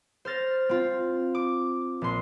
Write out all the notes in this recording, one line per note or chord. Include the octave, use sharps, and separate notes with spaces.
C5 F6 A6 A#6
C4 F4
D6
A#1 C6